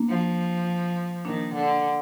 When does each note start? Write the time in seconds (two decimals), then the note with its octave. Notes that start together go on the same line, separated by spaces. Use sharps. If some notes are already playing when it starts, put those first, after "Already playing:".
Already playing: A#3 D4
0.10 F3
1.25 D#3 A#3 D4
1.54 D3